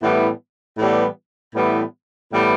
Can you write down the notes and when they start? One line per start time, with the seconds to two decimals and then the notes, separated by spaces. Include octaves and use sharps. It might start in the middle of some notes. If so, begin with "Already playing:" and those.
0.01 A2 E3 G3 B3
0.78 A2 E3 G3 B3
1.55 A2 E3 G3 B3
2.31 A2 E3 G3 B3